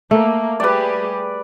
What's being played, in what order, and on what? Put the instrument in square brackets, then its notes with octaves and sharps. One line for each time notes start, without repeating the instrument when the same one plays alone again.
[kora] A3 [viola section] A#3
[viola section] G3 G4 G#4 [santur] B4 D5